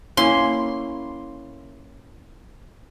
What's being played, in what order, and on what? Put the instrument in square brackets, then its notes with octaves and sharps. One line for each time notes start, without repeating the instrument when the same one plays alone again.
[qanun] A#3 C#4 E4 [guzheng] C6